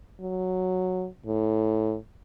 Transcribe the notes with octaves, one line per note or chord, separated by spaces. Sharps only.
F#3
A2